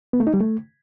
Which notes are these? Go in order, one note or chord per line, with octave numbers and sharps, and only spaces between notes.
B3
A3
D#4
G3
A3